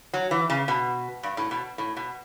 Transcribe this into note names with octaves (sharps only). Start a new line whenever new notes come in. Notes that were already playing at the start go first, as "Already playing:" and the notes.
F#3
E3
C#3
B2
G2
A2
B2
A2
B2